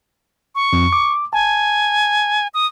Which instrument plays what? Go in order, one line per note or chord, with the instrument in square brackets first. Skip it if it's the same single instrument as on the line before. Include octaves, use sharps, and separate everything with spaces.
[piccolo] C#6
[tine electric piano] F2
D6
[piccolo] G#5 [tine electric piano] A5
[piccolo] D#6